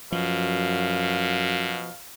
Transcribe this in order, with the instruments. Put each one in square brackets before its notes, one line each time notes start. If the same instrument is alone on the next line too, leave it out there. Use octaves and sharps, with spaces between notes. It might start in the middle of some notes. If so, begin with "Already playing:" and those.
[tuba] F#2 [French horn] B2 [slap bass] F3 [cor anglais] F5